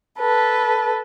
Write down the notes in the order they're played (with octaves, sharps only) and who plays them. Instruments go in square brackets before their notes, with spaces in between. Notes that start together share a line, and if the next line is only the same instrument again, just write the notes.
[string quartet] A4 B4